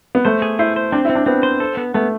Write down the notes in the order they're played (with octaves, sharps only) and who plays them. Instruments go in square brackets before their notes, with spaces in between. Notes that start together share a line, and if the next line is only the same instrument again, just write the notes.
[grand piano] B3
[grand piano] A3 [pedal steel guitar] C5
[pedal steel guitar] G#4
[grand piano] E4 [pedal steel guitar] C5
[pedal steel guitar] C5
[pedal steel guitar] C4 [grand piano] D4
[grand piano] E4
[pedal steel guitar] C4
[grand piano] D4
[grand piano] B3 [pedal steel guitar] C4
[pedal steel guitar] C5
A4
B3
[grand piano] A3 [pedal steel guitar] B3